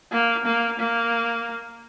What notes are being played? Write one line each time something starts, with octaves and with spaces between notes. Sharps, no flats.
A#3
A#3
A#3